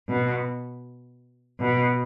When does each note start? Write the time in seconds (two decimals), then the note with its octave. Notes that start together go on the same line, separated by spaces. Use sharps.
0.08 B2
1.60 B2